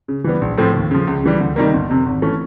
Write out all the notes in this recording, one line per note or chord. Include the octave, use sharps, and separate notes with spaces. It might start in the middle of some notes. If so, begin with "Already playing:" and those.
C#3
E3 G3 B3
A#1
A2 F3 A3 C4
D#2
C#3 F3
C#2
C#3 E3 G3
D2
C3 D#3 G3 A#3
G1
F2 C3
G#1
E3 A3 C#4